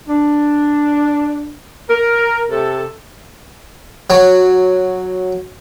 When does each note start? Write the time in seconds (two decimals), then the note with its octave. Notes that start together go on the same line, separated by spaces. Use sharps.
0.09 D4
1.90 A#4
2.51 C3 A4
4.10 F#3